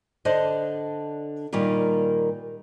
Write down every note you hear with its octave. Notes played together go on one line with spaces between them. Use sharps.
D3 D4 C5 D5 D#5
A#2 D#3 G3 A#3 F4